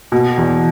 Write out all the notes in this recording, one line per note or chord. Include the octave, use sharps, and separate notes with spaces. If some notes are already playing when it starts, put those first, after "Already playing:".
B2
E2